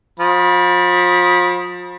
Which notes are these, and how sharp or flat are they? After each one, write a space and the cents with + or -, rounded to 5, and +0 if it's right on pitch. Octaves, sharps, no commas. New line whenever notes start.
F3 +35 B5 -35